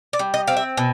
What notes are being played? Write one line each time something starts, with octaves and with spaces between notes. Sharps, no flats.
D5
G3
D#5
C4 F5
E5
B2